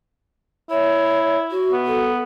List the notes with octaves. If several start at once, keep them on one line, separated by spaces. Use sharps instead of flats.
E4 C#5
F#4
B3
A4